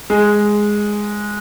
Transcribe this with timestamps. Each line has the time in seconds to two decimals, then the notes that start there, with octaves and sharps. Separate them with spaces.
0.10 G#3